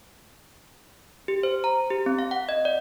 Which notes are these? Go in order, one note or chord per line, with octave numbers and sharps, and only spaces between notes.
G4
C5
A#5
G4
C4
F5
F#5
D#5
D5